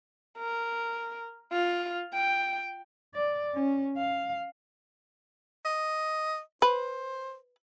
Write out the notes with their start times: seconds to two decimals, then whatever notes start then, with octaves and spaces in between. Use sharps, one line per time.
0.38 A#4
1.52 F4
2.14 G5
3.15 D5
3.54 C#4
3.97 F5
5.65 D#5
6.62 B4 C5